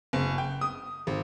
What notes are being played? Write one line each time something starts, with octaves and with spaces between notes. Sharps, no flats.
F#1
G5
D#6
G#1